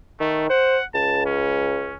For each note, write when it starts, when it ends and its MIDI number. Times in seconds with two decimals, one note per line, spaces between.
0.20 0.46 51
0.20 0.46 57
0.50 0.78 72
0.50 0.85 78
0.94 1.97 37
0.94 1.25 81
1.26 1.97 61